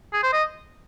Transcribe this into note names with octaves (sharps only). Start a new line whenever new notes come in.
G#4
C5
D#5